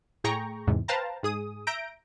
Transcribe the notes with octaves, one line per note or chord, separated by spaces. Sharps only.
A2 G#4 G5 A#5 C#6
E2 G#2 C3
B4 C5 F5 G5 A5 A#5
G#2 G#4 D#6
E5 A#5 G6 A#6 D7